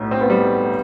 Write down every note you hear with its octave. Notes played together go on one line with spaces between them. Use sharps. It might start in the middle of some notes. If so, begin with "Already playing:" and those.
Already playing: B1 A2
C4
B3
G3